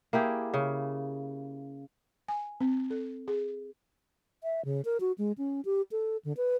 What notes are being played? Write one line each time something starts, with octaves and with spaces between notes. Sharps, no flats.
A#3 E4 G4 G#4
C#3
G#5
C4
A4
G#4
E5
C#3
A#4
F#4
G#3
C#4
G4
A4
D3
B4